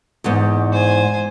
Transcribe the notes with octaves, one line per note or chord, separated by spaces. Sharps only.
E2 G#2
C5 G#5